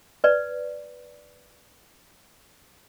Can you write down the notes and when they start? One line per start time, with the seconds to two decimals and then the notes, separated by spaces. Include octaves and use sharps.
0.24 B4 D5